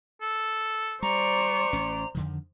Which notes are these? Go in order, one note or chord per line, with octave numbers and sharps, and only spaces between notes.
A4
G3 C5 D5 A#5 C#6
A1 C#4
F2 D3 D#3